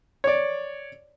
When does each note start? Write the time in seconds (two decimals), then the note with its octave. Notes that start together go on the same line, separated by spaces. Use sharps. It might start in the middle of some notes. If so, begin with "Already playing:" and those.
0.24 C#5 D5